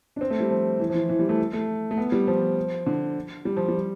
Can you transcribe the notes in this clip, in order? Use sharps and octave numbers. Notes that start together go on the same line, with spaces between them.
D4
C4
A3
G3
F3
E3
F3
E3
E3
G3
A3
A3
A3
B3
G3
F3
D3
G3
F3
G3